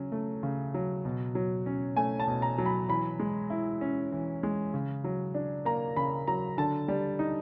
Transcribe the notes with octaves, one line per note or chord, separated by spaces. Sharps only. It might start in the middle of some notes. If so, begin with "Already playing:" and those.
Already playing: C#3 F#3 C#4
A3
C#3
F#3
B2
F#3
C#4
A3 G#5
A5
B2
A#5
F#3
B5
E3 B5
G#3
E4
C#4
E3
G#3
C#3
F#3
D4
A#3 A#5
C#3 B5
F#3 A#5
D3 A5
G3
D#4